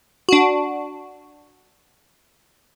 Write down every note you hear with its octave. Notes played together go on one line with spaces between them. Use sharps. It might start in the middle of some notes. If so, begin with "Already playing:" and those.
D4 F#4